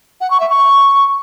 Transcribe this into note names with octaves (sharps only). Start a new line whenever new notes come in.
F#5
C#6
E5
C#6